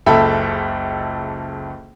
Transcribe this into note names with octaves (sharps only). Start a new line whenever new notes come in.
F#1 C#2 A4 E5 B5